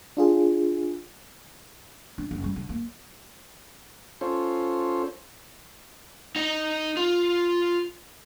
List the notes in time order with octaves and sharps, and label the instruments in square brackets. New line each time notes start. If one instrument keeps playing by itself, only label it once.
[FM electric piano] D4 F4 G#4
[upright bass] D4
F#1
G3
D3
A#3
[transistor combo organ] C#4 F4 A4 C5 C#5
[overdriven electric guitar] D#4 D#5
F4